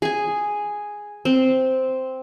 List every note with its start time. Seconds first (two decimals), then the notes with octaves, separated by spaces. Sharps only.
0.02 G#4 G#5
1.25 C4